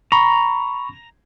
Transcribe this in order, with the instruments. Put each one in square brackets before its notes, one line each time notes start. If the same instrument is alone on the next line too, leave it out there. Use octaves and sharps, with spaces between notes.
[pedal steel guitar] A#5 [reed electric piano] B5 C#6